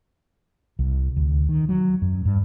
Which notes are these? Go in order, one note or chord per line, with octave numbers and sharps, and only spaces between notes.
C2
D2
D#3
F#3
F#2
G2